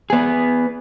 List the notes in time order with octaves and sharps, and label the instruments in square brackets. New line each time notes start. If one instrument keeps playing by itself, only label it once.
[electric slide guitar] B3 G#4